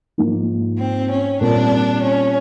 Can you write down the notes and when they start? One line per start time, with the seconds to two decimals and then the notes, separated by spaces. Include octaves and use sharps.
0.18 G#2 F3 A#3 D#4
0.79 C4
1.10 C#4
1.40 A#2 G3 C4 D4 F4 A#4
2.02 C#4